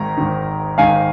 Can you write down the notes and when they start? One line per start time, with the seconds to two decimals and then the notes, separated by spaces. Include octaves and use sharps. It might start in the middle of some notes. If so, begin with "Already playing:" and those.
Already playing: G#1 G#2 D#3 A#5
0.18 G#1 G#2 D#3
0.78 G#1 G#2 D#3 F5 G#5